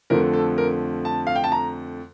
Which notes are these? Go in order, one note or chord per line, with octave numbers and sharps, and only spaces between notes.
F2 D3 F3 A3 A#4
A4
A#4
A5
F5
G5
A5
A#5